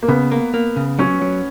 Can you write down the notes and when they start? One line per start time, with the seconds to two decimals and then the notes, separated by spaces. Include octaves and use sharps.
0.03 A#3
0.08 C#3 B3
0.31 A#3
0.54 A#3
0.76 C#3
0.99 F#3 C#4
1.22 F#3